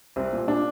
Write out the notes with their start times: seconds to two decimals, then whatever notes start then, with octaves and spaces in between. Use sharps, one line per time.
0.16 C2 C4
0.33 A#2
0.47 A#2 D4